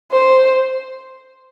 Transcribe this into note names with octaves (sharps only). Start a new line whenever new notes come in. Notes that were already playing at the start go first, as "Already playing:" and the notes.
C5